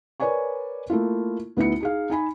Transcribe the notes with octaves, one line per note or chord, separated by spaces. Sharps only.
A#4 B4 C#5 D5 G#5 C#6
A3 A#3 E4 F4
D2 B3 D#4 E4 C#7
D#4 G#4 F5
D#4 G#5 B5